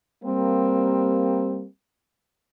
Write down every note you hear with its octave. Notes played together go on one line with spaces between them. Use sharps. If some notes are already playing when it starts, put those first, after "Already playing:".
G3 A#3 C4